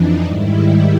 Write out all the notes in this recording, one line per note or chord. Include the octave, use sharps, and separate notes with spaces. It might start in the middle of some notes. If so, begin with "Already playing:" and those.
Already playing: F2 E3 D4 D#4
G#2 D#3 G3 E4